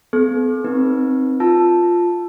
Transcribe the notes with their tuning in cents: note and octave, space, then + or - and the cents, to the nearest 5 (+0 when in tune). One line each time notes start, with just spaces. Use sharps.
B3 +40 A4 -45
C4 +0 D#4 +0 B4 -40
F4 +0 A5 +0 E6 +15